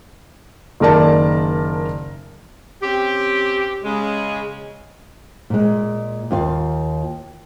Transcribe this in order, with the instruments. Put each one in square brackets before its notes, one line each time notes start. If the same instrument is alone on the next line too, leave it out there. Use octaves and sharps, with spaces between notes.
[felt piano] F#1 D#3 A#4 D5 A5
[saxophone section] C4 C#4 G4
C#3 G#3
[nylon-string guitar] A#2 G#3
D#2 F4 F5